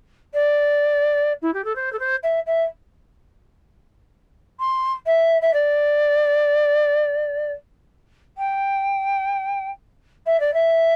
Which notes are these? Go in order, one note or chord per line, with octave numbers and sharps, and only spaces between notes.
D5
E4
G4
A4
C5
A4
C5
E5
E5
C6
E5
E5
D5
G5
E5
D5
E5